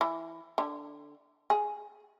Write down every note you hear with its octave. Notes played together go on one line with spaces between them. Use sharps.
E3
D3
G#4